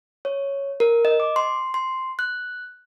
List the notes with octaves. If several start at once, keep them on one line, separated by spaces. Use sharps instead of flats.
C#5
A#4
D#5
D6
C6
C6
F#6